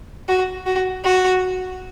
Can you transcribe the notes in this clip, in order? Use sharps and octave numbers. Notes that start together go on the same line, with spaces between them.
F#4
F#4
F#4